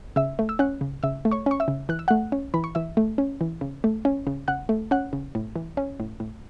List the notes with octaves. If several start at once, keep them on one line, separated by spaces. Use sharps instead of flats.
C#3 E5 E6
A3
E6
C#4 F#5 F#6
C#3
C#3 E5 E6
A3
C#5 C#6
C#4 C#6
E5 E6
C#3
E3 F#6
E6
A3 F#5 F#6
C#4
E3 B5
C#6
E3 E5 E6
A3
C#4
E3
C#3
A3
C#4
C#3
C#3 F#5 F#6
A3
C#4 F#5 F#6
C#3
A2
E3
C#4
A2
A2